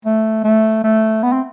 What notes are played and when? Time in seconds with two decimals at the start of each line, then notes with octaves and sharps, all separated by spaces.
0.05 A3
0.44 A3
0.84 A3
1.23 B3
1.32 C4